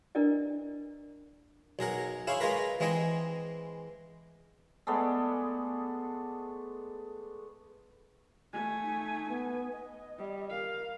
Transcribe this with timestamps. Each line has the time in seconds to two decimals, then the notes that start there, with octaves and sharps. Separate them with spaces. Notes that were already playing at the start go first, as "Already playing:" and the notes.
0.15 D4 E4 A#4 B4 D5 D#5
1.79 B1 G#4 A#4 F#5
2.27 E4 G#4 C5 C#5 F5
2.40 G#3 F4 G#4 A#4 B4
2.80 E3 G#3 C4 G#4 D#5
4.87 G#3 A3 B3 D5
8.53 A3 G#5
8.83 D#4
9.28 B3
9.72 D#5
10.18 G3
10.50 A#4 F5